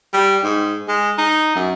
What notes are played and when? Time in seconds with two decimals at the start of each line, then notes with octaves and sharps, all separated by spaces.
0.13 G3
0.44 G#2
0.88 G#3
1.18 D#4
1.55 F#2